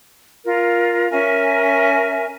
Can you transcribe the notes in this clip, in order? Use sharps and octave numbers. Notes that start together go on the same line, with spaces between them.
F4 A#4
C#4 A#4 E5 G#5